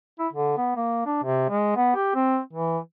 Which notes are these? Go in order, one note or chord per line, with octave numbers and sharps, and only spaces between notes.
E4
D3
B3
A#3
D4
C3
G#3
B3
G4
C4
E3